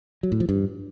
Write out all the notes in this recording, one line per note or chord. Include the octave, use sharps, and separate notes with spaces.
F#3
A2
F3
G2